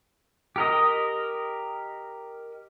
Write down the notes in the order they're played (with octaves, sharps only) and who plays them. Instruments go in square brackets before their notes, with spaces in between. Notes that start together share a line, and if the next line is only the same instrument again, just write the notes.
[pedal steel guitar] G4 A#4 D#5